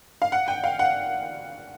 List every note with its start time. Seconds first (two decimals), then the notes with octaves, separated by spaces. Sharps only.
0.22 F5
0.32 F#5
0.48 G5
0.64 F5
0.79 F#5